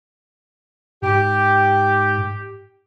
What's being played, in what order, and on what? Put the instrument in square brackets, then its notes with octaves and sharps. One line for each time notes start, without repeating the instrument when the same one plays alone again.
[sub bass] G#2 [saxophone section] G4